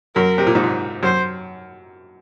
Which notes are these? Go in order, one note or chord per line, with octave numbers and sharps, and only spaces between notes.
F#2 A#4
C3
A#2
G#2
A#2
F#2 C5